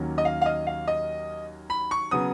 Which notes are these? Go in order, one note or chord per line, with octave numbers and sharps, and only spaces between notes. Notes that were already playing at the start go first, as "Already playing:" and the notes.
Already playing: D#2 D#3 F#3 A#3 C#4
D#5
F5
F5
D#5
F5
D#5
B5
C#6
C#3 F#3 B3 D#6